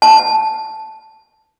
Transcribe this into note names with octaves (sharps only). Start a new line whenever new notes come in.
A5